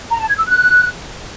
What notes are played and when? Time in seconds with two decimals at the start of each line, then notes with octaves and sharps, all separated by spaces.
0.09 A#5
0.18 A5
0.28 G#6
0.37 E6
0.46 F#6